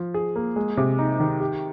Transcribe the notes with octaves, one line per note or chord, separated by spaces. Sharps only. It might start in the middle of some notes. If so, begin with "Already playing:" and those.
Already playing: F3 F4
G#4
A#3
G#3
C3
D#4
D#3
G4